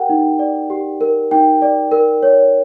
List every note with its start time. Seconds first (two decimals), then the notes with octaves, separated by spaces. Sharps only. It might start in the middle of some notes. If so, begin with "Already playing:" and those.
Already playing: G4 A#4 F#5 G5
0.09 D#4
0.39 D5
0.70 G4
1.01 A#4
1.31 D#4 G5
1.62 D5
1.92 A#4
2.23 C#5